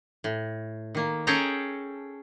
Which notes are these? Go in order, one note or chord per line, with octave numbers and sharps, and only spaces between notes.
A2
D#3 A#3
C#4 G#4 A4 G5 A5 A#5